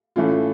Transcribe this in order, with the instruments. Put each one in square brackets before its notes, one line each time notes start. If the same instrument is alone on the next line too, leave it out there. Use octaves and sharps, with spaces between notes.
[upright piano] A2 E3 A3 C#4 F4